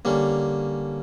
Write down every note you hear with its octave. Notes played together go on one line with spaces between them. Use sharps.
D3 G3 A#3 C#4